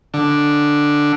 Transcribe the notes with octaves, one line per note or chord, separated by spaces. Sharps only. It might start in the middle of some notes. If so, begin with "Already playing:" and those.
D3